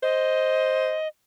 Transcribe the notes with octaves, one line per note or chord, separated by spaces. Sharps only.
C5 D#5